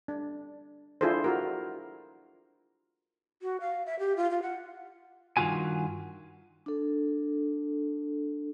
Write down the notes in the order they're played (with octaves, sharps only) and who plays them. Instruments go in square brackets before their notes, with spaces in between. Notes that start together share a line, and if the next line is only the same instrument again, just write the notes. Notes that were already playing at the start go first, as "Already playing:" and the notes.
[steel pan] D4
D4 E4 F4 G#4 A4 C5
F4 F#4 A#4
[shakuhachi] F#4
F5
E5
G4
F4
F4
F#5
[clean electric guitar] G2 D#3 F#3 F4 F#4 G#5
[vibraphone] D4 A4